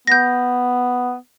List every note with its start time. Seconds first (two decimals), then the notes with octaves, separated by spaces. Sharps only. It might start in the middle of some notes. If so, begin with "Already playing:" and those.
0.07 B3 G6 A#6